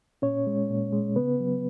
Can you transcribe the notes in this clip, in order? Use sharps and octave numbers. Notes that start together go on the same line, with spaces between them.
A#2 C#4 C#5
G#3
A#2
G#3
C#3 B3 B4
F#3